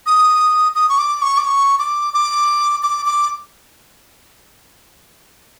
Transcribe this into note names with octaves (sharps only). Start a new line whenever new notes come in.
D#6
D#6
C#6
D6
C#6
D6
C#6
D6
D6
D6
D6